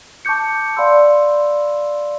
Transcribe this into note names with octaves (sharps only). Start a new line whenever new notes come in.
A5 C#6 D6 G6 C#7
D5 F5 F#5 B5 C6 E6